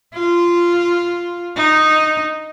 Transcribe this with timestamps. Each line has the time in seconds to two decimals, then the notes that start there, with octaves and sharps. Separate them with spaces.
0.14 F4
1.56 D#4